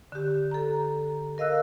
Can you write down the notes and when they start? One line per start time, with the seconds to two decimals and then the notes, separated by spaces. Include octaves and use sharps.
0.12 D3 G4
0.51 A4 A#5
1.38 A#4 D#5 F5 E6 F#6